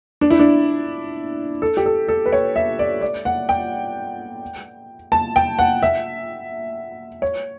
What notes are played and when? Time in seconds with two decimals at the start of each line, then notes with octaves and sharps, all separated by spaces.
0.21 D4
0.31 E4
0.39 D4
1.62 A4
1.77 G4
1.86 A4
2.08 A4
2.26 B4
2.32 C#5
2.56 E5
2.79 D5
3.01 D5
3.25 F#5
3.49 G5
5.12 A5
5.36 G5
5.59 F#5
5.83 E5
7.22 C#5